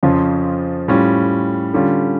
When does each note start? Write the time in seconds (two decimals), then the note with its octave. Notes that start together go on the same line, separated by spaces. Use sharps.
0.03 F2 C#3 F3 C#4 F4
0.88 A2 G3 C#4 F4
1.74 D3 G3 C#4 F4